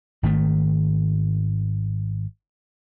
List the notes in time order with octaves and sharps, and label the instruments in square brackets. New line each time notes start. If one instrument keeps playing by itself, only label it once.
[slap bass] G#1 D#3 A3